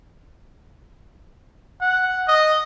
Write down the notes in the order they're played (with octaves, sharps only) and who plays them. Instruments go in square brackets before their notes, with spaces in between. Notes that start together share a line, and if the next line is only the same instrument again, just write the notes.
[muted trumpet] F#5
D#5